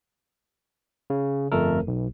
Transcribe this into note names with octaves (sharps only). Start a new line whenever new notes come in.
C#3
G1 F2 A3 A4 A#4
B1